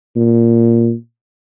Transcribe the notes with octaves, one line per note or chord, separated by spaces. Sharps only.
A#2